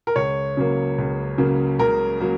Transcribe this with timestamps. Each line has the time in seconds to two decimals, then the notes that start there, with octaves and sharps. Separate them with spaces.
0.07 A#4
0.16 C#2 C#5
0.57 C#3 F#3 A#3
0.98 C#2
1.38 C#3 F#3 A#3
1.79 C#2 A#4
2.20 F#3 A#3